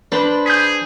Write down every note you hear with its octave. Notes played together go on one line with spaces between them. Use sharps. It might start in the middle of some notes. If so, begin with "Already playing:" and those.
D4 B4 C5 B5
G#4 G6 B6